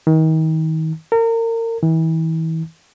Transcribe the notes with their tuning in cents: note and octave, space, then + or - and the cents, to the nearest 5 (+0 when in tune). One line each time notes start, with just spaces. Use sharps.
D#3 +35
A#4 -30
E3 -35